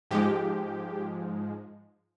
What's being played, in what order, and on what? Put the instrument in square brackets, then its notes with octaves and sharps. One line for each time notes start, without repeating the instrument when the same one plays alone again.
[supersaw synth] G#2 F3 G#3 G4